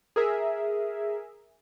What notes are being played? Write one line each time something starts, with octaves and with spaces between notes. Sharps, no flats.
G#4 A#4 E5